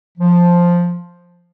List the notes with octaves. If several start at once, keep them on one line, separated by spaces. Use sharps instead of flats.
F3